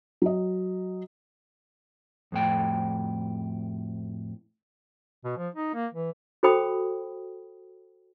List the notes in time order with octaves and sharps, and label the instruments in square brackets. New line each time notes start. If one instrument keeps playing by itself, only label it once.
[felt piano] F#3 D#5
[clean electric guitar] F2 A2 G5
[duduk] B2
F3
D#4
A#3
E3
[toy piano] F#4 A4 C5 G5 B5 D#6